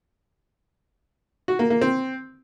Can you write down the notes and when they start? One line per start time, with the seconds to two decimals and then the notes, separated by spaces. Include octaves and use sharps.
1.48 F#4
1.59 A#3
1.70 A#3
1.81 C4